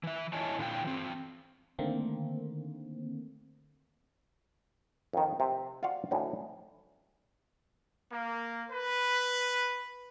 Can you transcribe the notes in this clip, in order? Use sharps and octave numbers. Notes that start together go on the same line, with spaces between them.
E3 E5
E4 C#5 D#5 G#5 A5
A#2 D3 E3 F4 B4 G5
E3 C4
D3 D#3 A3 A#3 C4
F2 D#3
C3
F4 F#4 D5 F5 F#5
D2 A2 C#4 D#4
A#3
B4